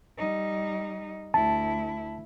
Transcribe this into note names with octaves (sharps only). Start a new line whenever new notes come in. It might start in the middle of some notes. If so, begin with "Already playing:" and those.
G3 D#4
D2 E4 A5